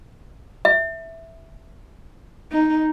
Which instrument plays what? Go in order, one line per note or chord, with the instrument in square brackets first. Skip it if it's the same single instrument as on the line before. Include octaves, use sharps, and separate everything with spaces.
[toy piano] E5
[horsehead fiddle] D#4